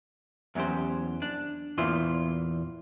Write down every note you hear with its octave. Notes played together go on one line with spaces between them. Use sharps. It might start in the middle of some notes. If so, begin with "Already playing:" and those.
E2 F#3 C#4 G4 C5
D4
E2 A#2 E3 F4 C5